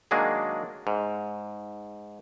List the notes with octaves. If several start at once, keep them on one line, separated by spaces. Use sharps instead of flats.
D#3 F#3 G#3 A#3 D4 G#4
G#2